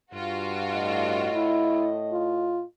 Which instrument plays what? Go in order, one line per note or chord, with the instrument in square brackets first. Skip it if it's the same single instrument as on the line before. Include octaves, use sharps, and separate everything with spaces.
[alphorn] G2 [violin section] F4 F#4
[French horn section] A2 D#5
[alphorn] E4
F4